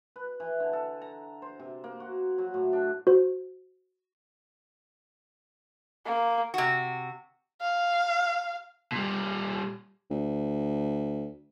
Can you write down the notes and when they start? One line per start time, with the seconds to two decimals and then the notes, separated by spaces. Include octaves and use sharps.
0.16 B4
0.40 E3
0.60 D3
0.73 A4
1.02 A#5
1.42 C5
1.59 C3
1.84 A#3
2.00 F#4
2.38 F#3
2.54 A2
2.73 D4
3.07 F#4 C5
6.06 A#3
6.54 C3 F#4
7.61 F5
8.92 A#2 G3
10.11 D2